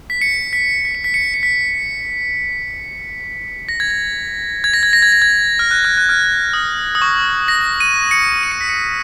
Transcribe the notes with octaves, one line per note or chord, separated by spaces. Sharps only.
B6
C#7
B6
B6
C#7
B6
C#7
B6
C#7
B6
A#6
G#6
A#6
G#6
A#6
G#6
A#6
G#6
A#6
G#6
F6
F#6
F6
F#6
F6
D#6
D#6
C#6
A#6
D#7
C#7
D#7
C#7
B6
C#7